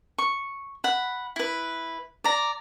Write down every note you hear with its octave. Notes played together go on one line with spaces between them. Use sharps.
C#6
F#5 B5
E4 B4
D5 A#5